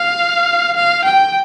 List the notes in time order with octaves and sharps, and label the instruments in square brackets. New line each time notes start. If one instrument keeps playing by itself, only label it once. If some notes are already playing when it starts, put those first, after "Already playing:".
Already playing: [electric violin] F5
F5
G5